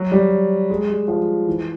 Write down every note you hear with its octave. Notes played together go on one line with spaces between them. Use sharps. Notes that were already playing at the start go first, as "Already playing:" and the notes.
Already playing: F#3
G3
G#3
G3
F3
E3